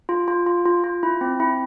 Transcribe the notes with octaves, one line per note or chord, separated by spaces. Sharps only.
F4
F4
F4
F4
F4
E4
C4
E4